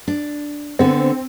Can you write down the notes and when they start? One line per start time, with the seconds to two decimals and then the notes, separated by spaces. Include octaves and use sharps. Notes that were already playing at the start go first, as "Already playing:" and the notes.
0.08 D4
0.79 D3 B3 C4